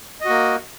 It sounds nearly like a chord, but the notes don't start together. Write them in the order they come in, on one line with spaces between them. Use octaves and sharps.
D#5 F#4 A#3